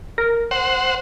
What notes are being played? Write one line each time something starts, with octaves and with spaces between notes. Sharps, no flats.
A#4
C5 F#5